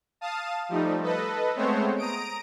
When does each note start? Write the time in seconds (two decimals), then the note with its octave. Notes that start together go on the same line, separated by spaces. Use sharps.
0.21 F5 A5 D#6
0.69 F3 G3 A3 D#4
1.02 A4 B4 D#5
1.56 G#3 A3 B3 C4 C5 C#5
1.97 A#5 D#6 D7